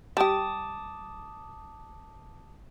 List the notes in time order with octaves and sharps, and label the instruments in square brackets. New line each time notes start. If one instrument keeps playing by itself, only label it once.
[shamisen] G3 G4 [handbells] A5 D6 D#6